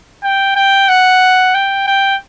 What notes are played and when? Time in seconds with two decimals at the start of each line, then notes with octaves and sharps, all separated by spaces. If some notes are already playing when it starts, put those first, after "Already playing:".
0.23 G5
0.56 G5
0.89 F#5
1.54 G5
1.87 G5